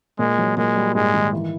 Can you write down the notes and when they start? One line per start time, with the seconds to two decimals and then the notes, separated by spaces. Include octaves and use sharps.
0.19 A#2 G#3
0.38 F#3
0.57 A#2 G#3
0.76 G3
0.95 G#2 G#3
1.14 D#3
1.33 E3